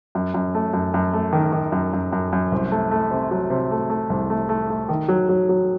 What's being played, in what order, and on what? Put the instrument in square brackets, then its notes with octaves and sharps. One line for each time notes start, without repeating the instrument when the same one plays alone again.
[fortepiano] F#2
F#2
A3
F#2
F#2
A3
D#3
D#3
F#2
F#2
F#2
F#2
C2
A3
A3
C3
F#3
C3
A3
A3
C2
A3
A3
A3
D#3
F#3
F#3
F#3